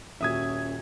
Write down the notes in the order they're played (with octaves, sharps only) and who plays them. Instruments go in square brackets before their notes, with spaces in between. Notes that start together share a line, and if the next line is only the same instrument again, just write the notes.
[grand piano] D#1 A#2 F#4 [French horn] C#4 [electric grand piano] E5 D#6 G#6